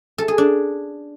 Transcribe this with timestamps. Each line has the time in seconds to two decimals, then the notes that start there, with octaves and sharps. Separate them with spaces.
0.18 A4
0.28 G#4
0.38 D4